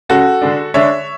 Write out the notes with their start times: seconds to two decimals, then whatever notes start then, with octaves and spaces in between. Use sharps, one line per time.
0.09 C#3 G#3 C#4 F#4 A4
0.42 D3 G#3 D4
0.74 D3 G#3 D4 C#5 E5